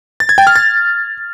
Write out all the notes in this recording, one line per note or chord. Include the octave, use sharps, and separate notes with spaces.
A6
G#6
G5
F6
A6